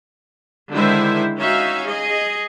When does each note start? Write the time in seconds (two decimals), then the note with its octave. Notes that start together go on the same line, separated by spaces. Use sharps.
0.72 D3 D#3 G#3 E4 C5 E5
1.38 C#4 D#4 F#4 E5 F5
1.86 G#4 D#5